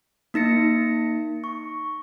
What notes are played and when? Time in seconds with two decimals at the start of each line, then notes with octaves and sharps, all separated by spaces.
0.34 A#3 D#4 A#6 C#7
1.44 C#6